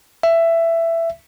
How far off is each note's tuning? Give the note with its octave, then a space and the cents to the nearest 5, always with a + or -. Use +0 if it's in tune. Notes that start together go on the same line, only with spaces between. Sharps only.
E5 +15